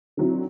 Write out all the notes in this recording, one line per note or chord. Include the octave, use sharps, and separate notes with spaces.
D3 F#3 C4 E4